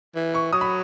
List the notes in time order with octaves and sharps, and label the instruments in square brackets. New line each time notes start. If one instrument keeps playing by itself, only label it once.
[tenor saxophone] E3
[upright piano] C#6
[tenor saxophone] F#3 [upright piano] D#6
[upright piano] B5